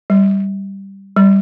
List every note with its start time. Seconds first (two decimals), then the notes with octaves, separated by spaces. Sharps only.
0.10 G3
1.16 G3